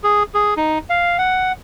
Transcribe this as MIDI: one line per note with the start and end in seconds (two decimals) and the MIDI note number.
0.04 0.23 68
0.34 0.54 68
0.57 0.78 63
0.90 1.17 77
1.18 1.52 78